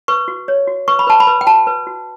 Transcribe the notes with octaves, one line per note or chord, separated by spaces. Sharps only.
B4 C#6
F#4
C#5
F#4
B4 C#6
B5
B4 A5
B5
B4
G5
F#4 A5
B4
F#4